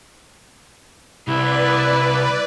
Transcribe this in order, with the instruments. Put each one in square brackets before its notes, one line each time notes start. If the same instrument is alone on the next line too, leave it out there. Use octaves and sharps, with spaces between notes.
[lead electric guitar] C2 [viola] E4 [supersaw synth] B4 D5